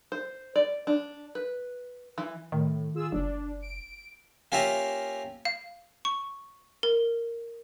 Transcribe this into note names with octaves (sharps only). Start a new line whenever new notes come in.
C5
D5
D4
B4
E3
A2 D#3
F4 G#4 E6
F#1 D4
D7
A#3 C#4 F4 G4 E5 A#5
F5
C#6
A#4